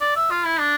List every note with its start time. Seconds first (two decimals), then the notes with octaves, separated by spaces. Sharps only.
0.01 D5
0.16 E5
0.30 F4
0.45 E4
0.60 D4